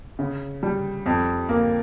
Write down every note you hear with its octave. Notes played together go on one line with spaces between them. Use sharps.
C#3
G3
F2
A#3